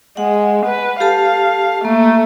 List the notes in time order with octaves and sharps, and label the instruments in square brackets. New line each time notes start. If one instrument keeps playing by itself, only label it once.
[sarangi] G#3 [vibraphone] F#5
[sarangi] B4
[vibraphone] G4 A4 A5 [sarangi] F5
[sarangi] A3 [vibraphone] A#3